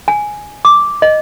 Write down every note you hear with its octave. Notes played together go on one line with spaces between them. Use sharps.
G#5
D6
D#5